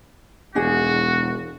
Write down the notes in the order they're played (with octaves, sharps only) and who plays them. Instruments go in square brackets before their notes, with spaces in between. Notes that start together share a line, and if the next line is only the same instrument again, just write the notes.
[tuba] E1 [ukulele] D4 D#4 G#4 [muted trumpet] F#4